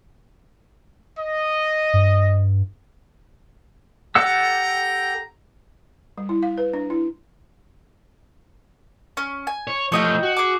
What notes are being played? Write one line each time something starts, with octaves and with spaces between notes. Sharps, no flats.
D#5
G2
G4 A4 F#5 G5 A#5 E6
G3
E4
F5
B4
D4
E4
C#4
G#5
C#5
F3 A3 C#5 D#5 G5
F#4
G#4 D6